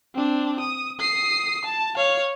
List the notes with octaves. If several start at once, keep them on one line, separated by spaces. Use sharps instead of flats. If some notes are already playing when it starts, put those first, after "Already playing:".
C4 D4
D#6
D#6 C7
A5
C#5 F5